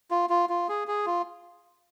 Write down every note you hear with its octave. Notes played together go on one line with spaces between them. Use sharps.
F4
F4
F4
G#4
G#4
F4